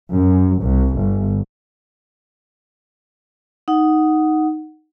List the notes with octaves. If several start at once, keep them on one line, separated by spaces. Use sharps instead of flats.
F#2
C2
G1
D#4 F#5